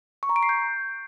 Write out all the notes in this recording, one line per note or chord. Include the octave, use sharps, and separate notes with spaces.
C#6
A#5
D7
C7
G6